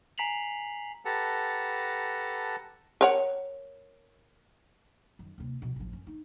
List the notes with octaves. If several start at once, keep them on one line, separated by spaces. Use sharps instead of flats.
G#5 A#5 B6 C7 F7 F#7
G4 A4 B4 F#5 A5 A#5
A#4 C#5 F#5
F#2 D#3
D#2 C3
B2 F3
A1 F3
F#2 C#4
D#4